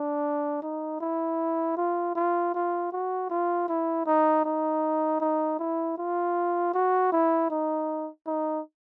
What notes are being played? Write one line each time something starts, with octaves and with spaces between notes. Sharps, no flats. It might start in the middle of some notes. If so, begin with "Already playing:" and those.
Already playing: D4
D#4
E4
F4
F4
F4
F#4
F4
E4
D#4
D#4
D#4
E4
F4
F#4
E4
D#4
D#4